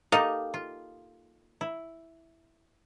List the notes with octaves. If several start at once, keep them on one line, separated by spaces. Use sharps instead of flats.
A#3 D#4 G4 A4 D#5 F5
F4
E4